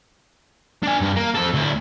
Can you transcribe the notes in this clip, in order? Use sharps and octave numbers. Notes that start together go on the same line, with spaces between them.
D4 G#5
G2
A#3
F3 A4
D2 E4